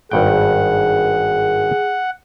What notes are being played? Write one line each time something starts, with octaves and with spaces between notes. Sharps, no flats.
G#1 G2 G#4 F#5 G5